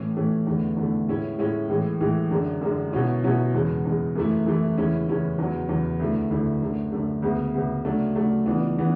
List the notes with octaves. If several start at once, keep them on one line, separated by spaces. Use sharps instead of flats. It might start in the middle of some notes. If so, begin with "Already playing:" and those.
Already playing: A2 E3 A3 C#4
A2 E3 A3 C#4
E2 D3 A3
E2 D3 A3
A2 G#3 C#4 E4
A2 G#3 C#4 E4
A2 E3 G#3
A2 E3 G#3
F#2 D3 G#3 D4
F#2 D3 G#3 D4
B2 F#3 C#4 E4
B2 F#3 C#4 E4
E2 C#3 G#3
E2 C#3 G#3
F#2 E3 A3 E4
F#2 E3 A3 E4
E2 C#3 G#3 C#4 E4
E2 C#3 G#3 C#4 E4
E2 C#3 F#3
E2 C#3 F#3
D2 D3 A3 E4
D2 D3 A3 E4
F#2 D3 A3
F#2 D3 A3
D2 C#3 G#3 B3
D2 C#3 G#3 B3
C#3 F#3 A3 D4
C#3 F#3 A3 D4
C#2 C#3 E3 B3 D4
C#3 E3 B3 D4